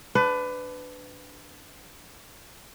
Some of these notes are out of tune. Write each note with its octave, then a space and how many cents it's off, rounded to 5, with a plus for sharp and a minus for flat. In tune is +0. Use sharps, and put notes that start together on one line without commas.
D4 +0 B4 +25